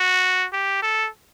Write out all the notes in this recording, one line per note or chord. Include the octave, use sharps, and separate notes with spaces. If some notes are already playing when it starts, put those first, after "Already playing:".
Already playing: F#4
G4
A4